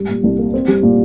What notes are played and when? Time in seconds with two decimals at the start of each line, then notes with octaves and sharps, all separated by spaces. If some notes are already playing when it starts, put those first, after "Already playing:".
Already playing: G#2 G3
0.09 A#2
0.24 C2
0.38 A#3
0.54 C4
0.68 G3
0.83 A#2